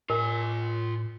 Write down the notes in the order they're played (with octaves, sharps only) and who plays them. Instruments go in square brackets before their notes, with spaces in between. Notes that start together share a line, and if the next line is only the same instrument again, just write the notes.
[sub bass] A2 [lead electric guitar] F4 G#5 [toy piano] A#4